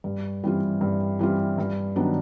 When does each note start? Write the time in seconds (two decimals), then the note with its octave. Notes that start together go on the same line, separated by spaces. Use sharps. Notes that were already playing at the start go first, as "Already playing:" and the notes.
0.04 G2
0.44 E3 G3 C4 F4
0.81 G2
1.19 E3 G3 C4 F4
1.58 G2
1.96 D#3 F#3 B3 D4